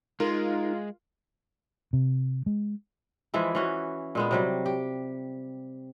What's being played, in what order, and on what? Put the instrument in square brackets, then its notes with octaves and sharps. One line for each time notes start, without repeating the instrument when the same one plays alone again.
[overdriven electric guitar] G#3 [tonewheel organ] D#4 [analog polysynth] F4 [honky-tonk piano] A#4
[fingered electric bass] C3
G#3
[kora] E3 F3 G#3 E4
E3 C#4 F#4
A#2 G#3 B3
C3 F#3 G3
G4